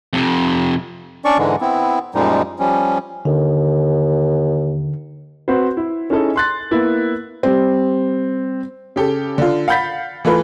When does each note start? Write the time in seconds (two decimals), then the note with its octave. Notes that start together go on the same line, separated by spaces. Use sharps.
0.13 F2 C3
1.25 C#4 D4 D5 C#6
1.38 G#2 D3 E3 G#3
1.61 B3 C4 E4
2.14 F#2 A#2 F3 G3 G#3 D#4
2.59 F3 G3 C#4
3.25 D#2 D3
5.48 C4 F#4 B4 C5
5.77 E4
6.10 C#4 D#4 E4 G#4 A4 D#5
6.36 C6 F#6 A6
6.71 A#3 B3 E4
7.43 G3 C4
8.96 C#3 G4 A4
9.38 D3 F4
9.68 F5 F#5 B5 G6 A6 B6
10.25 E3 A3 F4 B4